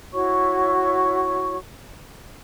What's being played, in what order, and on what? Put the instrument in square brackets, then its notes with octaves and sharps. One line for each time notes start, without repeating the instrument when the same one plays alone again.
[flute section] E4 F#4 C#5 C#6